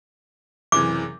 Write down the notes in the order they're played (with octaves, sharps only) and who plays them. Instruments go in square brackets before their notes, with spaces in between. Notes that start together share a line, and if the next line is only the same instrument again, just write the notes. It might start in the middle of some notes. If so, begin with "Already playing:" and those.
[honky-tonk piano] F#1 C3 E3 [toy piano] D6